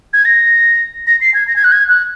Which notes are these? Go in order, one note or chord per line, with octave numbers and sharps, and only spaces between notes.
G#6
A#6
A#6
C7
G#6
A#6
G#6
F#6
G#6
F#6